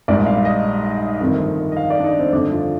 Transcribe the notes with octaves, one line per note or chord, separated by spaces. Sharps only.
A#1 G#2 G3 D5
F5
D#5
G1 F2 C3 D#3
D#5
F5
D5
D4
D#4
C4
G1 F2 D3 D4
F4